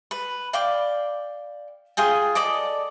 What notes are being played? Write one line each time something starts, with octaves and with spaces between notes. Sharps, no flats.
B4
D5 F5 G5 D6
F4 G#4 G5 G#5
A4 D5 D#5 D6